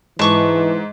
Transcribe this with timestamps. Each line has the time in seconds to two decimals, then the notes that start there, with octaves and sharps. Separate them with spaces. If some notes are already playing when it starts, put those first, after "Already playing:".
0.19 G#2 E3 A5 C#6 D6